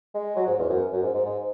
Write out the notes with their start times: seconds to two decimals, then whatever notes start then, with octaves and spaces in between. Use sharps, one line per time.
0.14 G#3
0.36 F#3
0.47 G#2
0.59 E2
0.70 F#2
0.92 F#2
1.03 G#2
1.14 G#2
1.26 G#2